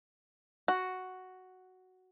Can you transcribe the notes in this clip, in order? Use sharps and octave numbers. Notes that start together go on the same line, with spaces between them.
F#4